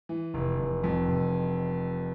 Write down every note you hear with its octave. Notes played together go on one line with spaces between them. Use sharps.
E3
F1
F1
F2
F1